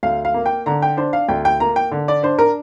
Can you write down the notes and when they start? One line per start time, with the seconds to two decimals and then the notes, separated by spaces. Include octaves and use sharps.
0.03 D2 F5
0.25 F5
0.34 A#3
0.46 G5
0.66 D3 A#5
0.82 G5
0.97 D4 C5
1.13 F5
1.29 D2 G5
1.45 G5
1.60 A#3 A#5
1.76 G5
1.91 D3
2.08 D5
2.23 D4 C5
2.39 A#4